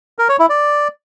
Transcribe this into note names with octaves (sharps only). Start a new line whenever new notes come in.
A#4
C#5
E4
D5